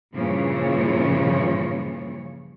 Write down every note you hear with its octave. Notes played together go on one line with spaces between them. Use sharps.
G2 A#2 C#3 E3 F3 C#5